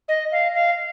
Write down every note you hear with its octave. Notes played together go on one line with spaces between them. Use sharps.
D#5
F5
F5